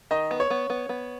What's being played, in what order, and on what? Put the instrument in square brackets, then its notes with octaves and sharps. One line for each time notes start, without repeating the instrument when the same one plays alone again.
[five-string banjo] D#3 [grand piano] D#5
[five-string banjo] B3
[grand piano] C#5
[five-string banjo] B3
B3
B3